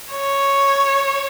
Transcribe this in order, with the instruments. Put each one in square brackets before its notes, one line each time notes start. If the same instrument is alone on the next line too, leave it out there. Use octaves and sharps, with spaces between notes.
[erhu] C#5